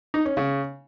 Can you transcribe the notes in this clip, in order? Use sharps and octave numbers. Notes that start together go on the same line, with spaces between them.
D#4
C#4
C#3